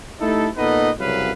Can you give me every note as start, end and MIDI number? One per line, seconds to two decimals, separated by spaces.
0.21 0.48 57
0.21 0.48 63
0.21 0.48 64
0.21 0.48 67
0.21 0.48 69
0.57 0.89 46
0.57 0.89 59
0.57 0.89 63
0.57 0.89 69
0.57 0.89 71
0.57 0.89 75
0.98 1.31 36
0.98 1.31 42
0.98 1.31 49
0.98 1.31 54
0.98 1.31 71
0.98 1.31 77